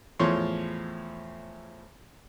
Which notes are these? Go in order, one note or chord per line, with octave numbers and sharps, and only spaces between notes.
E2 A2 F3 C#5 C6